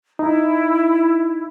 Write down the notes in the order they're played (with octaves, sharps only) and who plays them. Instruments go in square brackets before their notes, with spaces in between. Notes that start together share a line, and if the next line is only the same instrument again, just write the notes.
[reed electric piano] D#4 [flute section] E4